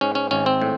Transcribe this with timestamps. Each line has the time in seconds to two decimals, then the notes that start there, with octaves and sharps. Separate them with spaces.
0.01 G#2 C#4
0.15 C#4
0.31 G#1 C#4
0.46 C4
0.61 A2